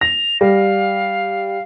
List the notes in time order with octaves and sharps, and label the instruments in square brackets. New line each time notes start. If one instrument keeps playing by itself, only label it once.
[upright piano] A#6 [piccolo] F7
[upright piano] G3 [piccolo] F5